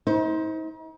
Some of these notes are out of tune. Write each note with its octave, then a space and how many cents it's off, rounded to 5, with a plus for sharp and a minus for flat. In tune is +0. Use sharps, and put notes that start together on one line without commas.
D#4 +40 C5 +0